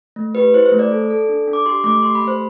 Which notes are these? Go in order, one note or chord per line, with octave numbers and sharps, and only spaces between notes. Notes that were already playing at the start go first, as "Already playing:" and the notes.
A3
G4 B4
E4 C5
C5
A3
D5
A4
A4
D4
D4
D6
G4 C6
A3 D6
G4 C6
B5
A3
C5